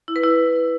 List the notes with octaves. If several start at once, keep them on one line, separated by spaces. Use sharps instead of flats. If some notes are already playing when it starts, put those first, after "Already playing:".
E4
B4
E4